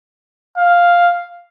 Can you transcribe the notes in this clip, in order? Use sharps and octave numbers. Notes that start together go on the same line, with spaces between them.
F5